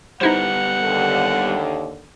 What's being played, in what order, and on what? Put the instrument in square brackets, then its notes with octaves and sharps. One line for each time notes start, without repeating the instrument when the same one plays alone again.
[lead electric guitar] G3 B3 [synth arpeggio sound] D#4 E4 C5 [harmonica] F#5
[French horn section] D#2 D3